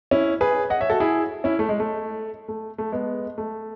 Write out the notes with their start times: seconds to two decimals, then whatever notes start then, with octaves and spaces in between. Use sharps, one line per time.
0.11 C#4 E4
0.41 G#4 B4
0.70 D#5 F#5
0.80 C#5 E5
0.90 F#4 A4
1.00 E4 G#4
1.44 C#4 E4
1.59 A3
1.69 G#3
1.80 A3
2.48 A3
2.78 A3
2.92 G#3 B3
3.38 A3